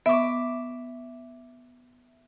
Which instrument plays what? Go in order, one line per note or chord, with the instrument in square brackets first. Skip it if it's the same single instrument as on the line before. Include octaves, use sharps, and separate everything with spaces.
[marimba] B3 C#6 [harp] E5 D6